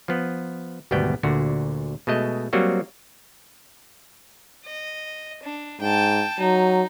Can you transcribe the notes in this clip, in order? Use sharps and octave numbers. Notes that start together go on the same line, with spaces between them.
F3 B3
G#1 D2 B2 G3 B3 G5
D2 A#2 D3 F#4
B2 G#3 A3 D#5
F#3 G3 A#3 C4 F#4
D#5
D4
G#2 G5 A5
F#3 D#4